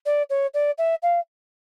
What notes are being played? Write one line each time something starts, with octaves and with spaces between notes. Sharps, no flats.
D5
C#5
D5
E5
F5